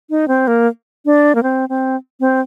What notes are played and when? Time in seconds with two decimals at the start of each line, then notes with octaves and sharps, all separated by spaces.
0.10 D#4
0.28 C4
0.47 A#3
1.05 D4
1.35 A#3
1.43 C4
1.69 C4
2.20 C4